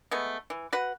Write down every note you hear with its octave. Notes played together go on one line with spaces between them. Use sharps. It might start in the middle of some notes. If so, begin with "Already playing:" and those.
G#3 A3 B3
E3
F#4 B4 F#5